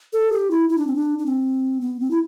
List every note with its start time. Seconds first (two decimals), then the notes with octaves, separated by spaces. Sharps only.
0.13 A4
0.32 G4
0.51 E4
0.69 E4
0.78 D4
0.87 C4
0.95 D4
1.19 D4
1.26 C4
1.81 B3
2.00 C4
2.11 E4